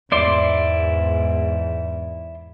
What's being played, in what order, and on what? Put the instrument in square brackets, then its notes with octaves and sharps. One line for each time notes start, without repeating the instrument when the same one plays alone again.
[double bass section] E2 G#2 [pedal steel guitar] E4 D5 C6